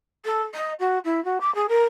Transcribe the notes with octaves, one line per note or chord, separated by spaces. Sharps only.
A4
D#5
F#4
E4
F#4
D6
G#4
A#4